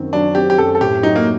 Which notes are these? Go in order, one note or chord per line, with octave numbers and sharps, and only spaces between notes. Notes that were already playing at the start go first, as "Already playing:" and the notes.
Already playing: F#2 D#3 F#3 C4
F#3 D4
C4 G4
G4
F#2 A4
A4
A2 G4
F#3 D#4
A#3